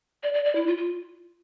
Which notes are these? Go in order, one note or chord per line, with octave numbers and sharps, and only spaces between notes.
D5
D5
D5
E4
F4
F4